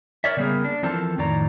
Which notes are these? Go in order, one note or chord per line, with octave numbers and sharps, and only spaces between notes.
A#4 C#5 D5 E5
C#3 G3 A#3 B3 G#4 A#4
D4
E3 F3 C4 A4 A#4 A5
F2 A2 D#3 D5 A#5